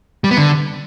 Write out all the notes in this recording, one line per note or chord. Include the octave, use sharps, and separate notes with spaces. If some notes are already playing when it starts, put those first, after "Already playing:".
G3
B3
D3